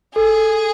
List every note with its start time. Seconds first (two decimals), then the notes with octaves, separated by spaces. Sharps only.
0.16 G#4 A4